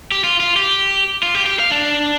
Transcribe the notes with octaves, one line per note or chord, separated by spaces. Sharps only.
G4
F4
F4
G4
F4
G4
G4
F5
D4